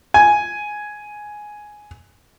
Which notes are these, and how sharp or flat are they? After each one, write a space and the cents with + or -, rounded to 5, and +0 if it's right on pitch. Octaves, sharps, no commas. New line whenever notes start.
G#5 +5